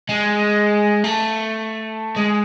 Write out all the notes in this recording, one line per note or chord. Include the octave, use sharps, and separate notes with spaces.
G#3
A3
G#3